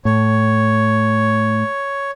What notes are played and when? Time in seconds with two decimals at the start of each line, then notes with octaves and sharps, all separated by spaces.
0.05 A2 C#5